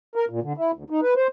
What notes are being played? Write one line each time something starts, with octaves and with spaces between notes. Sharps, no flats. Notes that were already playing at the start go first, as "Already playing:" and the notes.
A#4
A#2
D3
E4
D2
D#4
B4
C5